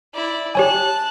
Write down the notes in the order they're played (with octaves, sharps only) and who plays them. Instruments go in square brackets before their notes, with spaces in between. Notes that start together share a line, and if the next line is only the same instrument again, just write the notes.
[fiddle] E4 D5
[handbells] G4 C#5 G#5 [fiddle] A5 F#6